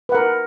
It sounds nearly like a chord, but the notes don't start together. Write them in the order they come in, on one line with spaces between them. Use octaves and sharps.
B4 F#5 A#4